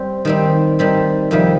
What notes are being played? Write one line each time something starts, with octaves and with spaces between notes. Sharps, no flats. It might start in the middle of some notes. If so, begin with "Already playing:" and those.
Already playing: G3 C4
D#3 G3 C4
D#3 G3 C4
F2 C3 D#3 G3